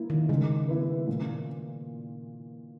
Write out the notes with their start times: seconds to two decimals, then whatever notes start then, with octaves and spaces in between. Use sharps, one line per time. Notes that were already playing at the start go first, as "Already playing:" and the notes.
Already playing: A#3 E4
0.10 D#3
0.29 C#3 G#3
0.68 B3 E4 B4
1.08 A#2